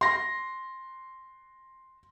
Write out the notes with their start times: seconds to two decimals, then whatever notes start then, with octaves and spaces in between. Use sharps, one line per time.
0.01 C6 A#6